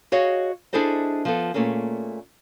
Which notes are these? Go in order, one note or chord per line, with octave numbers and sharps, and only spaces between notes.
F#4 G#4 C#5 D#5 F5
D4 E4 G#4 A4 C5 D#5
F3 B3 A4
A#2 A3 A#3 C#4 G#4